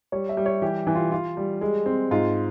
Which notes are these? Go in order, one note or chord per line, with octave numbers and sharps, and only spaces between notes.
G3 C#5
E5
G3
C#5
E3 G4
E3
F4
F4
G3
G#3
C4
G#2 F4